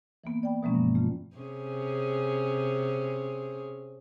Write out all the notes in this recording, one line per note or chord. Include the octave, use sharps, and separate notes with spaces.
E3 A#3 B3
D5 G5 B5
B2 E3 F3 G#3 A#3 C#4
G2
A3 F4
C3 C#4 G#4